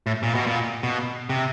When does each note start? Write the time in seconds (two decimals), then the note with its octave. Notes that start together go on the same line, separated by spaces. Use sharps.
0.06 A2
0.23 A#2
0.35 B2
0.47 A#2
0.83 B2
1.29 C3